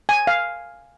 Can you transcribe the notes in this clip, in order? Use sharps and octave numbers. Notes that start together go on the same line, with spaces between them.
G#5
F5